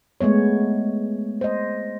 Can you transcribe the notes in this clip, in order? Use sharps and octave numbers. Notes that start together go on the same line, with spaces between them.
G#3 A3 B3 C#5
C5 D#5